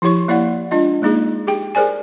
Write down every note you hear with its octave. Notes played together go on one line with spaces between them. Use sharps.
F3 E4 G4 C#5 C#6
A#3 E4 D5 F#5
G#3 D4 F4 D#5
G#3 A#3 D#4 G#4
G4 G#4 G5
G#4 A#4 C5 D5 G#5